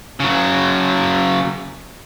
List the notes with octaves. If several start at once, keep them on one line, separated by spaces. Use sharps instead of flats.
C#3 F#3